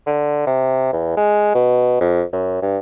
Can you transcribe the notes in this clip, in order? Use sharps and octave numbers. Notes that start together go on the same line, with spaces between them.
D3
C3
E2
G#3
B2
F2
F#2
G2